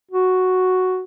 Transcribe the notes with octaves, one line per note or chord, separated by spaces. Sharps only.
F#4